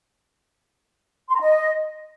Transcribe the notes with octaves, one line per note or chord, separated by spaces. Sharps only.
C6
A#5
D#5